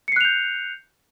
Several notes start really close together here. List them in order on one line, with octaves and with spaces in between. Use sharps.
C#7 C7 F#6 F7 G6